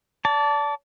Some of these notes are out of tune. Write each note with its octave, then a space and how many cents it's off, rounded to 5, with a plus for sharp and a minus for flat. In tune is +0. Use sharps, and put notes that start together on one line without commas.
D5 -30 A5 +0